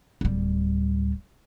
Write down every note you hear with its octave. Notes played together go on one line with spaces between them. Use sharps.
D1 G3